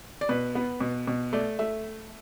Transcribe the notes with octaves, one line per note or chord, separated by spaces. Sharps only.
D5
B2 B4
B3
B2
B2
A3 D5
A3 E5